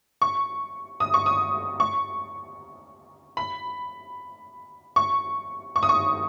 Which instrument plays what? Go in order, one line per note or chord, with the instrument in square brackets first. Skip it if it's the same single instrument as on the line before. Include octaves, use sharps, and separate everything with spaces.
[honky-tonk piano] C#6
D#6
C#6
D#6
C#6
B5
C#6
C#6
D#6
C#6